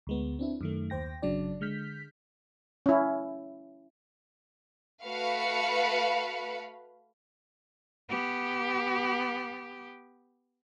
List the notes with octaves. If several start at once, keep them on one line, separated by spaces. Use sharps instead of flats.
D2 G#3 B3
C4 D4 E4
F#2 D#3 A3
D#2 C5 G5 A#6
G1 C#3 F#3 D4 D5
D3 G#3 F6 G6 B6
C#4 E4
A3 F#4 B4 F5 B5 C#7
B3 G4